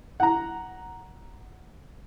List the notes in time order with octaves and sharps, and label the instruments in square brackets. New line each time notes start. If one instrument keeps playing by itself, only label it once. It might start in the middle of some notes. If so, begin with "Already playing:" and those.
[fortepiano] F#5 A#5